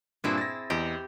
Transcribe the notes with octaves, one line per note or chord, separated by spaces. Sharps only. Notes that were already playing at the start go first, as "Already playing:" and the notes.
G2 A#2 C4 D4 E4 G#4
A6 A#6
E2 G4 D#5